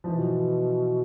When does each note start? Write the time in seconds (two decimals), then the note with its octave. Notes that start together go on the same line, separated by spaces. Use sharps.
0.04 F3
0.08 B2 E3